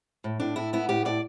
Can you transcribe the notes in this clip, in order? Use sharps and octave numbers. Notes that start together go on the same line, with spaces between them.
A2
A2 D4
A2 E4
B3 E4
A2 G4
A2 D5